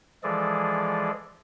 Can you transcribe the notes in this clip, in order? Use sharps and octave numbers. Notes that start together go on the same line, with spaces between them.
E3 F3 G#3 G#4 A4 D5